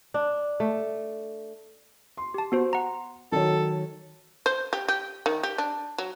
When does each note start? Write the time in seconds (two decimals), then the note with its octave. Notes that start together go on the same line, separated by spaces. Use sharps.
0.14 D4
0.60 A3
2.17 C6
2.34 G4 A5
2.52 B3 F#4 C5
2.73 F#5 A#5
3.32 D#3 F#3 A4 C#5
4.46 C5
4.73 G4
4.88 G4
5.26 D#3
5.43 G4
5.58 D4
5.98 F#3